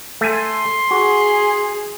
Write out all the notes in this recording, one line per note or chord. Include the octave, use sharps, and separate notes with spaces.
A3 G#5 C6
F#4 G#4